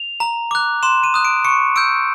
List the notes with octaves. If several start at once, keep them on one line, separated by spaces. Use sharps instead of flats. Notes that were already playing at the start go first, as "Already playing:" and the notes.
Already playing: F7
A#5
D6 F#6
C6 E7
D#7
D#6 F#6
D7
C#6 C#7
E6 G6 D7